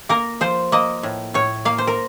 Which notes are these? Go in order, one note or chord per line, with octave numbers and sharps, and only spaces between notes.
A#3 A#4
F3 C5
A#3 D#5
A2
A2 C#5
A#3 F5
C5
A#4